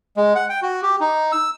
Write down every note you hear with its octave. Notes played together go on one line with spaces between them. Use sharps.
G#3
F#5
G5
F#4
G4
D#4
E6